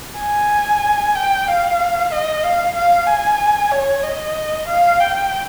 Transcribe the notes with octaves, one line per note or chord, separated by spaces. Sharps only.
G#5
G5
F5
D#5
F5
F5
G#5
C#5
D#5
F5
G5